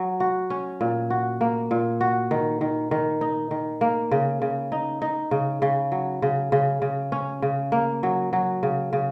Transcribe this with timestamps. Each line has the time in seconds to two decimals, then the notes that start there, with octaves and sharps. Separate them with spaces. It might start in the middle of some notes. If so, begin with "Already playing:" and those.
Already playing: F#3
0.20 F#4
0.50 C#4
0.81 A#2
1.10 F#4
1.41 A#3
1.71 A#2
2.01 F#4
2.31 D#3
2.61 D#3
2.91 D#3
3.21 D#4
3.51 D#3
3.81 A#3
4.11 C#3
4.42 C#3
4.72 D#4
5.02 D#4
5.31 C#3
5.62 C#3
5.92 F#3
6.22 C#3
6.52 C#3
6.82 C#3
7.12 C#4
7.42 C#3
7.72 A#3
8.03 F#3
8.33 F#3
8.63 C#3
8.93 C#3